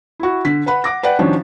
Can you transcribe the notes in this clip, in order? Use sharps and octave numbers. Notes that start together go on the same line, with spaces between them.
E4 F#4
D3 B6
B4 F#5 B5
F#5 D6 A#6
B4 D5 F#5 G5
D#3 F3 C#4 D4 F#4